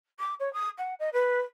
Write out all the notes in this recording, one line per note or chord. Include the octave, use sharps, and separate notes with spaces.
D6
C#5
D#6
F#5
D#5
B4